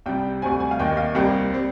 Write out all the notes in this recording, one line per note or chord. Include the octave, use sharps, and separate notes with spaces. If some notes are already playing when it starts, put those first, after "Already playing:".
C2 C3 G3 G5
D2 C3 G3 C4 G#5
G#5
F5
D#2 D#3 A#3 G5
F5
C2 C3 G3 A#3 G5
G3 C4